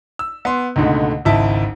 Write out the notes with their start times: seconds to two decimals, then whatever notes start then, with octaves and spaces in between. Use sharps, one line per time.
0.19 E6
0.45 B3 C6
0.76 C#2 G#2 B2 D3 A3
1.25 G#1 C#2 E4 E5 A5